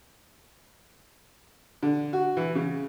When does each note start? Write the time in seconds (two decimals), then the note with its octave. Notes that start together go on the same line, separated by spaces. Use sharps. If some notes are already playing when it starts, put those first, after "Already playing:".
1.83 D3
2.13 F#4
2.37 E3
2.55 C#3